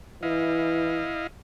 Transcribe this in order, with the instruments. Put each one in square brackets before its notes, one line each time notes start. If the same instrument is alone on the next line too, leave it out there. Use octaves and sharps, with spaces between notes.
[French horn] E3 [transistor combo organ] E4 D#5 F5